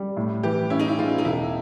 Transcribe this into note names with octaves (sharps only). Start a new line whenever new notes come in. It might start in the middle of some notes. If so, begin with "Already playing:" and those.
Already playing: G3
A2
E3 G4
C#4 E4
D#4
E4
G#3 F4
D#4
E1 E4